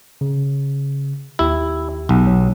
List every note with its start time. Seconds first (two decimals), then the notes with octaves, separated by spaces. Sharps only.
0.21 C#3
1.39 D#2 E4 G4
2.09 B1
2.27 F#3